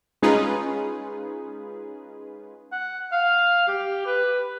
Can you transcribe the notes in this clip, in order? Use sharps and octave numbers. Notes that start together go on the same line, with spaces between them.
G#3 C#4 D#4 F4 G#4 B4
F#5
F5
G4
B4